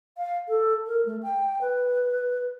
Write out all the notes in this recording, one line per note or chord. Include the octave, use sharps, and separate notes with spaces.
F5
A4
A#4
A3
G5
B4